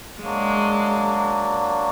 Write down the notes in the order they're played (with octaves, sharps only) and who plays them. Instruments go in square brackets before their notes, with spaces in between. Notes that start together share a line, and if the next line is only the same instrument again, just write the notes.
[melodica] F#3 A#3 D4 F#4 [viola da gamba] G#3